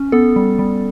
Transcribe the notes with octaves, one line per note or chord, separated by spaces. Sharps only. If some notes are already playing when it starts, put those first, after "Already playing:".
Already playing: C#4
B3 A4
G3
G3